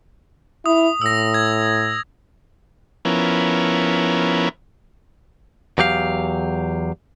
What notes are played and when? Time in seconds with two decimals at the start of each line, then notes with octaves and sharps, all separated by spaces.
0.66 E4 D#6
1.02 A2 E6 A#6
1.34 G#6
3.05 F3 B3 C#4 E4 A#4
5.78 E2 F#3 G4 F5